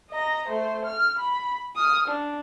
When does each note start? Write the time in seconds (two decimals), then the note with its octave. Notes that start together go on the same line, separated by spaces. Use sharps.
0.11 D#5 A#5
0.48 A3 C5
0.85 F6
1.19 B5
1.76 D#6 F6
2.08 D4